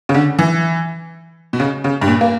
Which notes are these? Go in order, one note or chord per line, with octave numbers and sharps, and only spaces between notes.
C#3
D3
E3
B2
C#3
C#3
G2
A#2
A#3